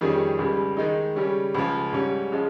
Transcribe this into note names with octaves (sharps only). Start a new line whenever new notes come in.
F2 D#3 G3 C#4 G#4
C#2 C#3 G3
D#3 G#3 D#4
C#3 G3 C#4
C#2 C#3 F3
G#2 G3 C#4
C#3 F3 G#3